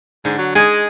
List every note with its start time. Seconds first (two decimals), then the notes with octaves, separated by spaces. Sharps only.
0.25 G#2 D3
0.39 F#3
0.55 G#3 D#4 G#4